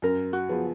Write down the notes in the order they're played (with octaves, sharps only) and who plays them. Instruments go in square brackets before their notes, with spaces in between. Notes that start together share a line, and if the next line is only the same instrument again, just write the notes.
[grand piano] F#2 [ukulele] A#4
[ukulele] F#4
[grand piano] F3 B3 F4 G#4